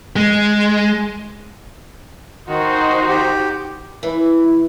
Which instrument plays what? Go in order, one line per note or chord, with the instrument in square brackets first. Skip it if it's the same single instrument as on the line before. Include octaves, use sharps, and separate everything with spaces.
[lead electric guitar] G#3
[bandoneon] D#3 [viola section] D#4 C5 [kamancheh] F#4 [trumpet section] C6
[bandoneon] G4
[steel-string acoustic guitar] E3